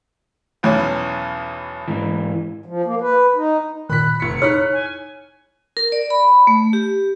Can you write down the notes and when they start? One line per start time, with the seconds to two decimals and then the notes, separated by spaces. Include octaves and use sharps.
0.63 B1 E2 C#4
1.88 G#2 E3
2.66 F3
2.86 A#3
3.01 B4
3.36 D#4
3.90 A#2 D#3 B5 F#6 B6
4.20 F1 B6 C#7
4.42 D#4 E4 G#4 C#5 F6 F#6 B6
4.73 G#5
5.77 A#4
5.92 D5
6.10 B5
6.47 A3
6.73 G4